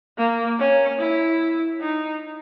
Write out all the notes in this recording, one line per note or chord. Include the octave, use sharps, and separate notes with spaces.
A#3
C#4
E4
D#4